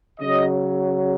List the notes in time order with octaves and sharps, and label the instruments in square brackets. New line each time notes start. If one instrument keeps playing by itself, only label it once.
[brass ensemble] C#3 F#3 D#5